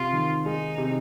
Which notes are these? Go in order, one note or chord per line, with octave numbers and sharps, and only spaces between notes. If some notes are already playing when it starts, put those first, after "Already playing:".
Already playing: C3 F4
D#3
G#3 D#4
C3